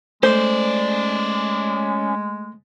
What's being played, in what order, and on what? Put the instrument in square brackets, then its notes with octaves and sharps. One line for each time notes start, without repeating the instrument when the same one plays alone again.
[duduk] G#3 [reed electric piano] A3 [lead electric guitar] C#4 D5 [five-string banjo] C5